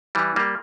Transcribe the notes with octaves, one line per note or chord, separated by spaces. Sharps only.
E3 G3
G3 A#3